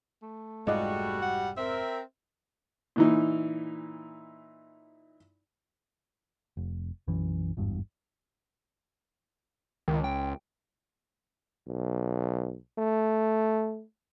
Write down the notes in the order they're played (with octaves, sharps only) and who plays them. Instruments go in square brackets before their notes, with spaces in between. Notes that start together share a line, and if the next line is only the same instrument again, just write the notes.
[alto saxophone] A3
[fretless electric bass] F1 G#2 G#3 [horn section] G3 F#4 [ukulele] F4 D5 D#5
[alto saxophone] F#5
[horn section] C4 A#4 [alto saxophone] E5
[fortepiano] A#2 E3 D#4
[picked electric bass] F1
B1 F#2 E3
G#1 E2 G2
[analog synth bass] C#2 [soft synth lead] D#3
[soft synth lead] G5
[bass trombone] B1
A3